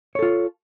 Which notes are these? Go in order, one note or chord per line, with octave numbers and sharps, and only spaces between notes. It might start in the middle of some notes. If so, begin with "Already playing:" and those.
F4 A4 C#5